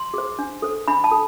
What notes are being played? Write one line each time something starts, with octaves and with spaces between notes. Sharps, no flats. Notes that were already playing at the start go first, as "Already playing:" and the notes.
Already playing: C6
G#4 C5
D4
A4 C5
D4 B5
A5
A4